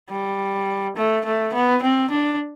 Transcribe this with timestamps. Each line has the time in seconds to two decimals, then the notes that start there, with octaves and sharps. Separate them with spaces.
0.10 G3
0.96 A3
1.25 A3
1.53 B3
1.83 C4
2.11 D4